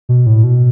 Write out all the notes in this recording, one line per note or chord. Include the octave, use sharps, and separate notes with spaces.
B2
A2
B2